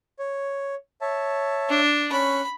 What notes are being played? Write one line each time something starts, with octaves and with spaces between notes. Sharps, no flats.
C#5
C#5 E5 A5
D4
C#4 B5 C#6 F#6